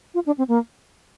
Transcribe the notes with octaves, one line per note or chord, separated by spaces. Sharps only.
F4
D4
C4
A#3